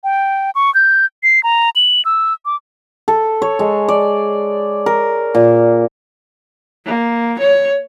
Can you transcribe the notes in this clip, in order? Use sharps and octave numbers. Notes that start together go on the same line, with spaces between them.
G5
C#6
G6
C7
A#5
F#7
E6
D6
A4
C#5
G#3
D5
A#4
A#2
A#3
C#5